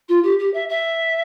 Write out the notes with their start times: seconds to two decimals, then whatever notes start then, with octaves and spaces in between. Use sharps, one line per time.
0.08 F4
0.23 G4
0.39 G4
0.53 E5
0.69 E5